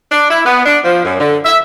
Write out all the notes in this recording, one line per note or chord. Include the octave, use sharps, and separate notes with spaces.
D4
E4
B3
D4
F3
F#2
D3
E5